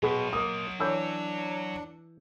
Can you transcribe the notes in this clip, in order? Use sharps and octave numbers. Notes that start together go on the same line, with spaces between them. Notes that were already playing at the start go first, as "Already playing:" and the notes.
B2 F#3 G#4 B4 G5 C6
A#3 A#4 D#5 D#6
E3 D4 C#5 E6 G6